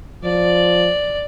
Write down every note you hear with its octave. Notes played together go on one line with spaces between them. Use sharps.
F3 D5